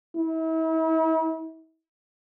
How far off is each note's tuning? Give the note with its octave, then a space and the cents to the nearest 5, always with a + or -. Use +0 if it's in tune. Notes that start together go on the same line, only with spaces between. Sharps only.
E4 -40